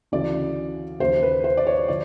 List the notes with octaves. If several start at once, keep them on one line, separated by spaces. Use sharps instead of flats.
D2 C#3 E3 D5
D#2 C#3 F3 C5
B4
C5
D5
C#5
D3 F3 D5